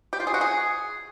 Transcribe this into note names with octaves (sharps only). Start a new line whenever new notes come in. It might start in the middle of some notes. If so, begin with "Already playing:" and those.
G4
F4
G#4
F#4
G#4